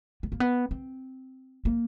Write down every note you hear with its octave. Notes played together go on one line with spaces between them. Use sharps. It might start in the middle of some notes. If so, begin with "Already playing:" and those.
B3
A#3
B3
C4
A#3